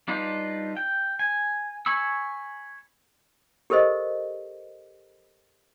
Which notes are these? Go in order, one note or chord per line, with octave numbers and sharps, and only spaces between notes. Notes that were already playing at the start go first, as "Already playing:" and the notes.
G3 D4 D#4 F4 B4
G5
G#5
G#5 B5 C#6 E6
G4 A4 A#4 C5 D#5